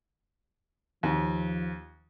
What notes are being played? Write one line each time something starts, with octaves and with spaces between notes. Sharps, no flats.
D#2 F3